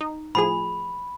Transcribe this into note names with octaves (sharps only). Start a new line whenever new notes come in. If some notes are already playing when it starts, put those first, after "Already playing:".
D#4
A2 F3 G#4 B5